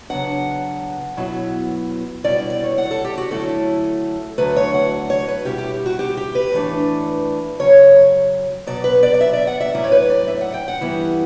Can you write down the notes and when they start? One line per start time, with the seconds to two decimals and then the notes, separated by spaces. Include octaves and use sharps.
0.09 C#3 F#3 B3 D4 F#5
1.17 B2 F#3 B3 E4
2.24 B2 G3 C#4 E4 D5
2.50 D5
2.64 C#5
2.78 F#5
2.91 A4
3.04 G4
3.18 F#4
3.31 D3 F#3 A3 C#4 E4 A4
4.38 D2 D3 F#3 A3 B4
4.56 C#5
4.74 F#5
5.10 C#5
5.28 B4
5.45 B2 G3 C#4 E4 G4
5.58 G4
5.86 F#4
5.99 G4
6.17 G4
6.35 B4
6.52 A2 E3 A3 D4
7.60 F#2 C#3 F#3 C#4 C#5
8.67 B2 F#3 B3 D5
8.84 B4
9.03 D5
9.14 D5
9.21 E5
9.33 D5
9.47 F#5
9.61 E5
9.74 A2 F#3 C#4 E4 D5
9.84 C#5
9.92 B4
10.10 D5
10.28 E5
10.41 F#5
10.54 G5
10.68 F#5
10.81 G2 E3 G3 B3 E4